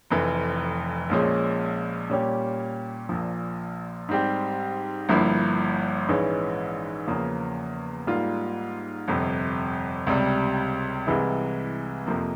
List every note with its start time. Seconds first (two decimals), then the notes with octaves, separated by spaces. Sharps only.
0.11 F1 F2 E3
1.10 A#1 A#2 F3 G#3 C#4
2.10 A#2 G3 C#4 G4 C#5
3.09 A#1 A#2 F3
4.09 G#2 G3 C4 G4
5.09 G1 G2 F3 A#3 E4
6.08 A#1 G#2 E3 G#3 C#4
7.07 E2 C#3 F3 A#3
8.07 G#2 G3 A#3 F4
9.08 G1 F2 C3
10.07 C#2 C3 G3
11.07 C2 C3 E3 G#3 E4
12.06 F2 C3 F3 A#3